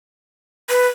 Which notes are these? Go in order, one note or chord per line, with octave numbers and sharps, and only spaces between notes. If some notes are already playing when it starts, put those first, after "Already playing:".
B4